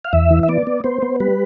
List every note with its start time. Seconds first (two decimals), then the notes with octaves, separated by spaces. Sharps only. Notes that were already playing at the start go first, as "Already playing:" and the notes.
0.05 F5
0.13 E2 E5
0.31 E3
0.43 E5
0.49 B3 D5
0.67 B3
0.84 B3 C5
1.02 B3
1.20 G3 B4